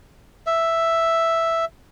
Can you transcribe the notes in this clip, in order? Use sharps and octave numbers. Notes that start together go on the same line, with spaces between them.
E5